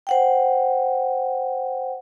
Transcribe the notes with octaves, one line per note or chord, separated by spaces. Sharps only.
C5 F#5 G5